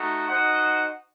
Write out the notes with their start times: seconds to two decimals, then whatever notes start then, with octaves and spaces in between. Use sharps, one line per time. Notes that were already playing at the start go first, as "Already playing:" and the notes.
Already playing: A3 D#4 F#4
0.28 D#4 F#4 C5 D#5 F#5